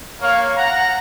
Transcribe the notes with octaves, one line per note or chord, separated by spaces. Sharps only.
A#3 C#5 F5
F#5 A#5